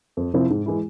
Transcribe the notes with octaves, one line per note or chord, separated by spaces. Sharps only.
F2
C3 F3 C4 E4
G#2
E3 G#3 E4